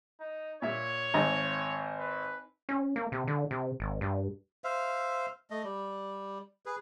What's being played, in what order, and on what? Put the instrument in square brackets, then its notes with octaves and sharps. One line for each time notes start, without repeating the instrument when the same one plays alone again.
[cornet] D#4
[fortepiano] A#2 E5 [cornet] C#5
[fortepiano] G#1 D#5 A#5
[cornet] B4
[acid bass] C#4
A#3
C3
D3
C3
G#1
G2
[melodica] C5 E5 F5
A3 D#5
G3
G#4 B4